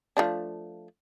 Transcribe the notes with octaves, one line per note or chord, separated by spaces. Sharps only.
F3 A3 D4